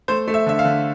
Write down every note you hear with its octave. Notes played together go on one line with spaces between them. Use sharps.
A3 C5
A3
E5
D3 E5
F5
D3